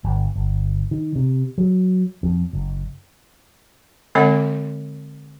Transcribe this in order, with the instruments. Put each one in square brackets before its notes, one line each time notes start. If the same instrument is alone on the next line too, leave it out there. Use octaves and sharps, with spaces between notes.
[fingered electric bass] G1
G1
D#3
C3
F#3
F2
F#1
[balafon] D3 G#3 C4 C#5 F#5